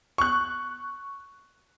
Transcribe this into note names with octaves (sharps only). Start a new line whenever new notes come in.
C#6 F#6